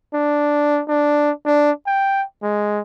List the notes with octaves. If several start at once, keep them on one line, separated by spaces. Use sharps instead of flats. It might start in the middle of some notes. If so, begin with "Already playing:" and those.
D4
D4
D4
G5
G#3